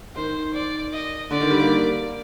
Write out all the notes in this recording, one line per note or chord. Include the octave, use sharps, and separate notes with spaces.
D#3 C5
D5
D#5
D3 D5
D#3
G3
A#3